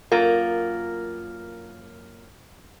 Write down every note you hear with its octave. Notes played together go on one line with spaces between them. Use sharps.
F#2 A#3 F4 A#4